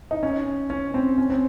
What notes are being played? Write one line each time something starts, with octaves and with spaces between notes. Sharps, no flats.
D#4
C#4
C#4
C4
C#4
C4